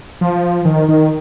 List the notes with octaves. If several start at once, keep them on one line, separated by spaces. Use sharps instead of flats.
F3
D#3
D#3